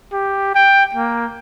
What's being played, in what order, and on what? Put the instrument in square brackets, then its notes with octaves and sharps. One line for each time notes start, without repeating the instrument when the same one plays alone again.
[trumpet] G4
G5
A#3